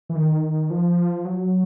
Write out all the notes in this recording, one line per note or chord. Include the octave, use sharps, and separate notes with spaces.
E3
D#3
F3
F#3